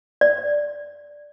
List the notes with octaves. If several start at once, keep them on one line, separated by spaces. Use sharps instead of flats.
D5